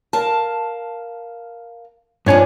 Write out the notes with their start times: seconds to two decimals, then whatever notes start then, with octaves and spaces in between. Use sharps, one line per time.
0.13 A#4 F5 A5
2.26 G2 F3 D4 D#4 C#5 G#5